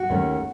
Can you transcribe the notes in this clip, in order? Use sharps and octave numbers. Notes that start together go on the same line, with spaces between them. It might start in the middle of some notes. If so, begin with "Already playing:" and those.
Already playing: F#4
D#2 D#3 A3 C#4